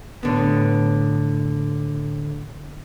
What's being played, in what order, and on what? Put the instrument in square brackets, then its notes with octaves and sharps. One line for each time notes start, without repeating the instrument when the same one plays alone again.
[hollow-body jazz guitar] A2 D3 B3